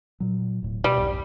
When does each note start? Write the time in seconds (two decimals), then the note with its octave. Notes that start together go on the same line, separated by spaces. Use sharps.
0.20 A#2 F#3
0.62 D1 A2
0.84 B2 G3
0.97 B1 E2 G2